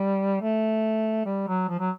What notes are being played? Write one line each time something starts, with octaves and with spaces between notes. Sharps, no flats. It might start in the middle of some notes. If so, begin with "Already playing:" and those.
Already playing: G3
A3
G3
F#3
F3
F#3